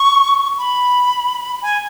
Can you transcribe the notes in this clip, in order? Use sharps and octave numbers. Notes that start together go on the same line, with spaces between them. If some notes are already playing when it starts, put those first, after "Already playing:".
Already playing: C#6
B5
G#5